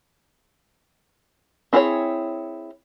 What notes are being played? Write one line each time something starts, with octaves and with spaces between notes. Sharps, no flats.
C4 E4 G#4 A#4 C#5